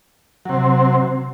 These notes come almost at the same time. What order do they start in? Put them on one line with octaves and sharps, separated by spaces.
F#3 C3 C4